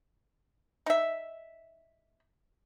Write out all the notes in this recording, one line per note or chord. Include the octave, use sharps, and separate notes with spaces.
D#4 E5